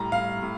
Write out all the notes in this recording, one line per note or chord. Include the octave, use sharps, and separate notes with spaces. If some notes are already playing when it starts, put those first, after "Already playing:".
Already playing: A2 G3 A#5
F5
A2